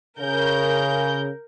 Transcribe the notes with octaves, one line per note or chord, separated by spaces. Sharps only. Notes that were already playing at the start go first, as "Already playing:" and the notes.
C#3 A#4 G6